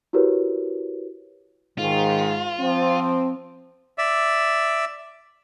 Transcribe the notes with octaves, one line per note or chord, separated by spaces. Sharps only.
E4 F#4 G4 A#4 B4 C#5
G#2 D#3 F4
F3 C4
D5 E5